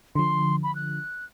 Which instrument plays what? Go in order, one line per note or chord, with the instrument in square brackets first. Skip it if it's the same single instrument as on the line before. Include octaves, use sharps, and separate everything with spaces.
[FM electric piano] D3 F3 [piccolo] C6
[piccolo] B5
F#6